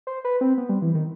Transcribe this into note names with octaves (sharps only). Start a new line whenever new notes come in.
C5
B4
C4
B3
G3
E3
D#3